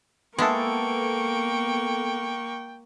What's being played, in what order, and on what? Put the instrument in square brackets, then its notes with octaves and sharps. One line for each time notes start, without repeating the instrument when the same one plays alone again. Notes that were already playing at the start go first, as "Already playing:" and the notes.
[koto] G#3 E4 [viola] A#3 C#6 [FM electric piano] B3 A4 [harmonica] G5